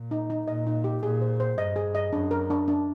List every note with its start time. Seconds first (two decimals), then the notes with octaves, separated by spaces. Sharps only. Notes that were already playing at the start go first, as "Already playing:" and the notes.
Already playing: A#2
0.11 D#4
0.30 D#4
0.48 A#2 D#5
0.67 D#4
0.84 G4
1.03 A#2 G#4
1.21 C5
1.40 C5
1.58 G2 D#5
1.76 G#4
1.95 D#5
2.13 F#2 D4
2.31 A#4
2.50 D4
2.68 D4